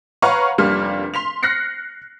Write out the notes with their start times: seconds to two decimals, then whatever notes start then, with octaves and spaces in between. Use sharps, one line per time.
0.22 B4 C#5 F5 F#5 A#5 C#6
0.58 F1 G3 A#3 D4 F6
1.14 C6 B6 F7
1.43 F6 F#6 A#6 C7 C#7